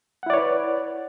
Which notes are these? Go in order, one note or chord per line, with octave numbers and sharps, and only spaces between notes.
E4 B4 C#5 D5 F#5